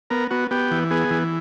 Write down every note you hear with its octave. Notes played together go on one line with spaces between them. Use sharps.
B3 A#4
B3 F#4
B3 G4
E3
B3 G#4
E3